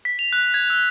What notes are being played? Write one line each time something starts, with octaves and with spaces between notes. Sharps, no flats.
B6
F7
F#6
G#6
E6